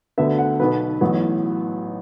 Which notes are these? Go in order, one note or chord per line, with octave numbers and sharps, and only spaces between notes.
D2 D3 B3 E5
F#5
B1 B2 B3 B4
A1 A2 F#3 B3